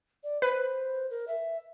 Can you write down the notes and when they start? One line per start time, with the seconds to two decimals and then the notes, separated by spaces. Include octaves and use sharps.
0.24 D5
0.42 B4 C5
1.11 A#4
1.28 E5